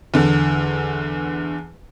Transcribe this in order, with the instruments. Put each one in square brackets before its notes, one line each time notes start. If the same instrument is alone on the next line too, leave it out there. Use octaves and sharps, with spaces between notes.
[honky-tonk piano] E2 D3